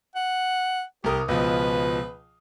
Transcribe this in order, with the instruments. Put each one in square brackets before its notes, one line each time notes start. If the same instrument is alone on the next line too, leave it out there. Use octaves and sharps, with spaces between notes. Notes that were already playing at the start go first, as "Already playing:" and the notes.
[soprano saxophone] F#5
[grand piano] C2 A#4 D#6 [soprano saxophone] G4
[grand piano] C#2 B2 F3 [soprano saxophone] B4